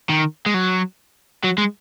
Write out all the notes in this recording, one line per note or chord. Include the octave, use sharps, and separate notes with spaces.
D#3
G#3
F#3
F#3
G#3